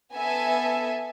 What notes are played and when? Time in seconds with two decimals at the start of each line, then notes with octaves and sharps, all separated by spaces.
0.14 B3 A4 E5 G#5